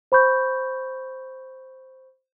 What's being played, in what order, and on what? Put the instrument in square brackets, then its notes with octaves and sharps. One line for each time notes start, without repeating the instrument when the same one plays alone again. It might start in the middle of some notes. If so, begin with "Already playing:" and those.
[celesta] C5 B5 C#6 G6